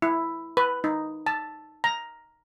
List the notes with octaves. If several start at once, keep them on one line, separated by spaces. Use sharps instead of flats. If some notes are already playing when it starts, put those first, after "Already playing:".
E4
B4
D#4
A5
A#5